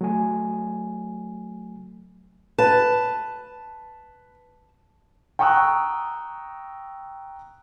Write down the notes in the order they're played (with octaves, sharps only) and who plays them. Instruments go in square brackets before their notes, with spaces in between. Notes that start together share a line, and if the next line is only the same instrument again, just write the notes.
[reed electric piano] F#3 A3 G#5
[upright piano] B4 [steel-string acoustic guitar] A5
[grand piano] G5 A#5 C#6 D#6 E6 F#6